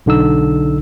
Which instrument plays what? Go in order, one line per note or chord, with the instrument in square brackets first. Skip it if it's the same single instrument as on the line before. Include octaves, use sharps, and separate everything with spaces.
[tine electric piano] B1 D3 D#4 E6